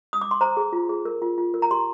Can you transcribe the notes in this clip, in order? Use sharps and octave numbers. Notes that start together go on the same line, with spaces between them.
D#6
D6
C6
C5 A#5
G#4
F4
G#4
A#4
F4
F4
A#4
A#5
G4 C6